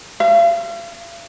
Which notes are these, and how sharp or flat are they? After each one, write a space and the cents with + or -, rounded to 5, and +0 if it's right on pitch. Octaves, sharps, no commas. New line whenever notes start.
F5 -45